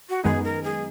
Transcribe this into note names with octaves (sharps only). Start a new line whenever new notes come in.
F#4
F#2 D#3 G#3 B3 D#4 G#4
A#4
G#4